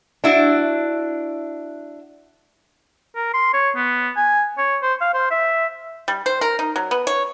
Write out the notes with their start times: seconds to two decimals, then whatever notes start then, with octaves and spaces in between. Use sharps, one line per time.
0.24 D4 E4 F#4
3.15 A#4
3.34 C6
3.54 C#5
3.76 B3
4.16 G#5
4.58 C#5
4.82 C5
5.01 F5
5.14 C5
5.31 E5
6.08 G3
6.26 C5
6.41 A#4
6.59 D#4
6.76 F#3
6.91 B3
7.07 C#5